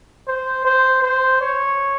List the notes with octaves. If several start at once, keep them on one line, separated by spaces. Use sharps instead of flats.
C5
C5
C5
C#5